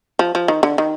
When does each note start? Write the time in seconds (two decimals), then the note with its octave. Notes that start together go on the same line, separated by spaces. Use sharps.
0.19 F3
0.35 F3
0.48 D#3
0.63 D3
0.78 D#3